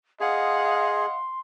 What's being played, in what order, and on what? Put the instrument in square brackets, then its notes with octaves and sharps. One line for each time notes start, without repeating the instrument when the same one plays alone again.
[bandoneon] G#4 [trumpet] D#5 [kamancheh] F5 F#5 [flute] C6